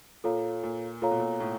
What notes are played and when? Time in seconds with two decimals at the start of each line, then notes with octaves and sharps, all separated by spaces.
0.24 A#2 F4 A4 C#5 F5 A#5
0.63 A#2
1.02 A#2 F4 A4 C#5 F5 A#5
1.11 B2
1.19 A#2
1.40 A2